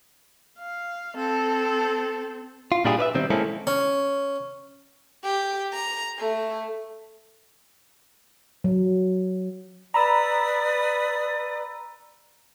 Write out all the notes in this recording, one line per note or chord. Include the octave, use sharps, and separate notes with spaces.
F5
C4 A4
F4
A#2 G3 D4 E4 G4 G#4
B4 D5 E5
B2 D#3 G3 C4
G#3 A#3 C4 C#4 E4 A4
C#4
G4
A#5
A3
F#3
B4 D5 A#5 B5 D#6 E6